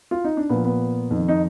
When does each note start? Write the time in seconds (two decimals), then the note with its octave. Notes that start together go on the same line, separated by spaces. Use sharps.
0.11 F4
0.24 D#4
0.37 D4
0.49 A#2 F3 B3
0.64 B3
1.11 F2 D#3
1.28 D#4